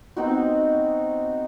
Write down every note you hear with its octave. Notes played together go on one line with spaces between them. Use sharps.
B3 C4 D#4 F#4